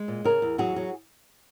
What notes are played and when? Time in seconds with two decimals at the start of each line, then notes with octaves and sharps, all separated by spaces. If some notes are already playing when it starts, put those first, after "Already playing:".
Already playing: G#3
0.08 A#2
0.24 C#3 G#4 A#4
0.42 E2
0.58 F#3 F#4 G#4
0.76 F#3